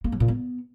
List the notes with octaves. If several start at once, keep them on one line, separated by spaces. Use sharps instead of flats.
A#3
F#3
A#2
B3